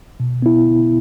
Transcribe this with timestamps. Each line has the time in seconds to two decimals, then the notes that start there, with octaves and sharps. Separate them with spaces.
0.20 B2
0.42 B3 E4